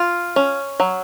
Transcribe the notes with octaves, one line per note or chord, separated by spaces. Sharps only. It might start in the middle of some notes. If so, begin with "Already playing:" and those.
Already playing: F4
C#4
F#3